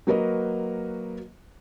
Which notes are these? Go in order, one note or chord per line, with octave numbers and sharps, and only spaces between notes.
F#3 A#3 F#4 A#4 B4 D#5